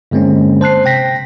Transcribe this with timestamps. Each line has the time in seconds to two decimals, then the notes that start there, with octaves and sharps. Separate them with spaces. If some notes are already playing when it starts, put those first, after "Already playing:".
0.11 G2 D3 G#3 A#3 C4 C#4
0.61 C5 A5 F#6 C7
0.85 C3 G5 A#6 B6